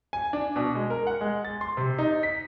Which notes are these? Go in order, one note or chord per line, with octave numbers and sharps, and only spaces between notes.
G#5
D4
B2
G#3
A#4
F#5
G#3
A6
C6
C3
D#4
B6